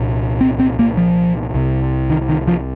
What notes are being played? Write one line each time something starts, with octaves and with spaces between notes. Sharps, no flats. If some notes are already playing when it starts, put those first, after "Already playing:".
Already playing: C2 A#2
C4
C4
A#3
F3
C2 C3
D#3
D#3
F3